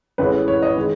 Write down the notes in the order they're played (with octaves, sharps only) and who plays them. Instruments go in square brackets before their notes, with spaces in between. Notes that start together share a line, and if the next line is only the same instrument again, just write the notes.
[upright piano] A1 A2 E3 G#3 B4
C#5
D#5
D#3 G#3